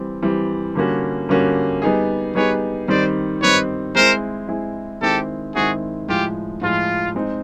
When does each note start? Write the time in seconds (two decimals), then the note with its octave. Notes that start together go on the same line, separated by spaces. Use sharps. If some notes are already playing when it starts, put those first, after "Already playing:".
Already playing: E3 G3 C4
0.23 E3 G3 C4
0.75 D3 G3 A#3 C#4 F#4
1.29 D3 G3 A#3 C#4 F#4
1.82 G3 B3 D#4 G#4
2.35 G3 B3 D#4 G#4 B4 C#5
2.88 D#3 G3 C4 D#4 C5 D5
3.41 D#3 G3 C4 D#4 B4 C#5
3.95 G#3 C4 E4 G#4 A#4 C5
4.48 G#3 C4 E4 G#4
5.01 D#3 G#3 C4 E4 G4 A4
5.55 D#3 G#3 C4 E4 F#4 G#4
6.08 A2 F3 G#3 F4 G4
6.61 A2 F3 G#3 F4
7.15 G#3 C4 D#4